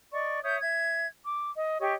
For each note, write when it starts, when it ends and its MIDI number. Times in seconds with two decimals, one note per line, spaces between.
0.11 0.39 74
0.11 0.39 75
0.11 0.39 85
0.43 0.59 73
0.43 0.59 76
0.43 0.59 87
0.43 0.59 91
0.61 1.07 76
0.61 1.07 92
1.26 1.51 86
1.56 1.77 75
1.79 1.94 67
1.79 1.94 73
1.79 1.94 75
1.79 1.94 85